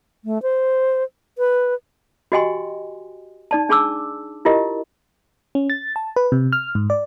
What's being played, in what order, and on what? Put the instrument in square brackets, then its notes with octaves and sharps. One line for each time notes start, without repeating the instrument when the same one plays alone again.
[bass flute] A3
C5
B4
[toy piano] F#4 G4 D#5 G5 G#5 C6
D#4 D5 A5
D4 G#4 A5 D6 E6
E4 F4 G4 A#4 D#5
[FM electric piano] C#4
A6
A5
B4
C3
F6
G#2
D5